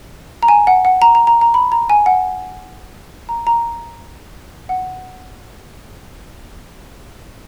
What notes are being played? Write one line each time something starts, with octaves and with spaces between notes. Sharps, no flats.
A#5
G#5
F#5
F#5
A#5
A#5
A#5
A#5
B5
A#5
G#5
F#5
A#5
A#5
F#5